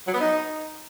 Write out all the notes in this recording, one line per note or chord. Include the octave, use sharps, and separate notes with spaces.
F#3
B3
D#4